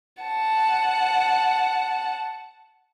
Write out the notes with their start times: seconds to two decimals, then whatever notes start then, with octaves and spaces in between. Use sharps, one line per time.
0.23 F#5 A5